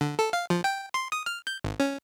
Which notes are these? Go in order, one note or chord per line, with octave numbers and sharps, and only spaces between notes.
D3
A4
F5
F3
G5
C6
D#6
F6
G6
G#1
C#4